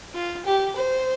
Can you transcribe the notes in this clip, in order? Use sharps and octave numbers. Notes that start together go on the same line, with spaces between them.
F4
G4
C5